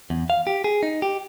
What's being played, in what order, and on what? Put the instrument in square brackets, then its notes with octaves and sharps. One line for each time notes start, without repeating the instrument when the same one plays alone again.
[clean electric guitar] E2
F5
G4
G#4
D#4
G4